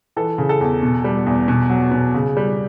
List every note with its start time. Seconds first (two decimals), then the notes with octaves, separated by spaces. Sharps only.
0.16 E3 A4
0.38 C#3
0.49 A4
0.61 E2
0.83 B2
1.04 G3
1.27 E2
1.48 B2
1.70 F#3
1.91 B2
2.14 C#3
2.37 G3